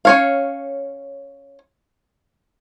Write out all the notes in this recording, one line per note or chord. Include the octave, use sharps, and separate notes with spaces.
C#4 C#5 F5